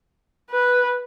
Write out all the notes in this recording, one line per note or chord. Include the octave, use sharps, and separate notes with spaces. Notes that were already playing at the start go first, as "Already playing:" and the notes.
B4